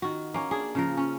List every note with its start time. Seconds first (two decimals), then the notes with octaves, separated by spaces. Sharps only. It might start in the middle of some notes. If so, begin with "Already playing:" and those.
0.02 D#3 F#4
0.34 A#3 C#4
0.51 D4 G#4
0.75 C#3 F3 A#4
0.97 C#4